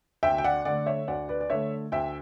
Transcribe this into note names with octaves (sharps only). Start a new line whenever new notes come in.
D2 E5 G5
G5
D5 F#5
D3 A3 D5 F#5
C#5 E5
D2 D5 F#5
B4 D5
D5
D3 A3 C#5 E5
D2 E5 G5